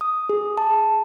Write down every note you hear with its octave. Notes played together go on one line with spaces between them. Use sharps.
D#6
G#4
A5